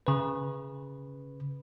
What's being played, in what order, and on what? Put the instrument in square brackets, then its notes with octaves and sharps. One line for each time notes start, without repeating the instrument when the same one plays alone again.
[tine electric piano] C#3 B4